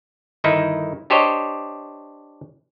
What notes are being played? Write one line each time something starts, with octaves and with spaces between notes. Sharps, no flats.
G1 D#3 D#4 E4 E5
D4 G4 C5 C#5 D#5